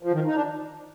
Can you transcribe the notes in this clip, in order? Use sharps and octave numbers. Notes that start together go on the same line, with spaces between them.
F3
D#3
D#4
D4